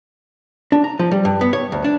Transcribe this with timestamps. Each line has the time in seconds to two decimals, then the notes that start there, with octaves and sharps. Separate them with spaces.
0.72 D4
0.84 A#5
0.99 F3
1.12 G3
1.25 G2
1.41 B3
1.53 C#5
1.72 D2
1.84 D4